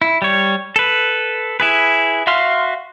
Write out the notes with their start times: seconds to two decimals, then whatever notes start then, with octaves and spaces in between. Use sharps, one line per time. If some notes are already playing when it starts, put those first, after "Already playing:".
0.02 E4
0.22 G3 C#5
0.76 A4 B4
1.60 E4 G#4 B4
2.27 F#4 E5 F5 C6 F6